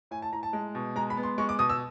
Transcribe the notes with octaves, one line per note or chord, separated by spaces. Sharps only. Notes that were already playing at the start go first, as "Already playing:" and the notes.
A2 G#5
A5
A2 A#5
A5
G#3
B2
G#3 A#5
B5
B3
C6
G#3 C#6
D6
B2 D#6
E6